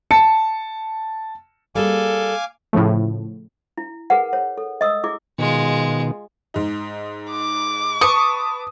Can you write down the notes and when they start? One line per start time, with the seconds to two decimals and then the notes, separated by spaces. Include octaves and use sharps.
0.11 A5 C#7
1.75 G3 A#3 G#4 A4 F5 G#5 D6
2.73 A2 C#3 F3 A3
3.77 E4
4.10 G#4 A#4 B4 F#5
4.33 C#5
4.57 A4
4.81 D#5 D#6 E6
5.04 E4 G#4 D6
5.38 B2 D#3 G#3 F4
6.54 G#2 D#4
7.31 D6
8.01 B4 A5 C#6 D#6